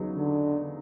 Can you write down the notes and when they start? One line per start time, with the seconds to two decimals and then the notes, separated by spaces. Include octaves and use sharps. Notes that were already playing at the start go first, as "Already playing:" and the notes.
Already playing: E2 C#3 F#3 B3 D#4
0.15 D3